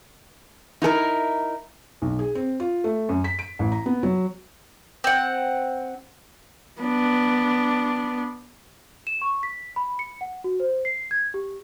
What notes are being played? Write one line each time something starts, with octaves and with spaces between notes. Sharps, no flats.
D#4 E4 A4 A#4
B1
G#4
C4
F4
A3
F#2
B6
D7
A1
A#5
B3
F#3
C4 F#5
B3 D4
E7
C#6
B6
B5
C#7
F#5
F#4
C5
C7
G#6
G4